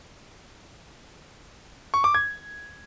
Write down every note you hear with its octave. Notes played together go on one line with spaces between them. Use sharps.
C#6
D6
G#6